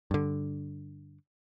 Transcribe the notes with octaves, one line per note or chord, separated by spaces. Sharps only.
G2 D3